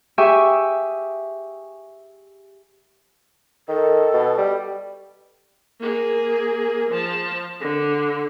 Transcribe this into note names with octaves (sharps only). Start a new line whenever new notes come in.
G4 G#4 E5 G5 G#5 C#6
D#3 A4
B2
G3
A#3 G#4
F3 A5
D3